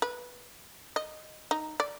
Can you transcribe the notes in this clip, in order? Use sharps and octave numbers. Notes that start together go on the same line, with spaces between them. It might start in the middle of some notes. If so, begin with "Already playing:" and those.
B4
D#5
D#4
D5